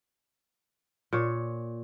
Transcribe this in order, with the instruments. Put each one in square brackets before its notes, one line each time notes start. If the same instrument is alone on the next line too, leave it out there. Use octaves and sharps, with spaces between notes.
[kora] A#2 C#5